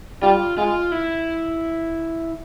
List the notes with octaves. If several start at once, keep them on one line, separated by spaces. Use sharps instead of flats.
G3 F4
G#3 F4
E4